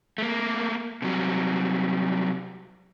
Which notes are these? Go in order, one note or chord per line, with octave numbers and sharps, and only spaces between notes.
A3 A#3
C3 F#3 G3